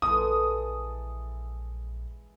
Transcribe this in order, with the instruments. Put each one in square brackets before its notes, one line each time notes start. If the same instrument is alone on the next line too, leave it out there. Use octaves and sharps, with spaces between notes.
[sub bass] A#1 [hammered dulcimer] E3 G#3 A4 [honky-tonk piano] D#6